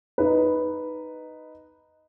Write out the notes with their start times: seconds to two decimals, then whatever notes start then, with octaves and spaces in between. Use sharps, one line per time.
0.18 D#4 B4